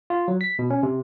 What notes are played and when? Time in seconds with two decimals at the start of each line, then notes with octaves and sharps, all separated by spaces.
0.10 F4
0.28 F#3
0.41 B6
0.59 B2
0.70 C#4
0.83 C3